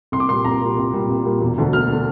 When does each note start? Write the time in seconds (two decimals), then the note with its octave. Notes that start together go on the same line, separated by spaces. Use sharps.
0.12 C2 C6
0.20 D6
0.28 A#2 G3 C6
0.45 C2 A#5
0.61 A#2 G3
0.78 C2
0.93 A#2 G3
1.09 C2
1.25 A#2 G3
1.41 E1
1.58 D2 D3
1.73 E1 F6
1.92 D3